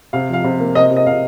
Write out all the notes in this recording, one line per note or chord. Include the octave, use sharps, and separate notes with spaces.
C3 F5
F3 F5
C3
A#3
C3 D#5
C3
D#5
C3 F5